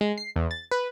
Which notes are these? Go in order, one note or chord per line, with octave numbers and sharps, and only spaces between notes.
G#3
C7
E2
A6
B4